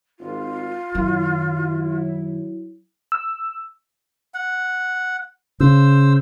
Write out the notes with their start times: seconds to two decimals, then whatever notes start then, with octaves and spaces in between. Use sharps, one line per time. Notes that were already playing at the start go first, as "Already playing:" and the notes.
0.19 G#1 F4
0.95 F#2 D#3 F#3 E4
3.12 E6
4.34 F#5
5.60 C#3 C5 E6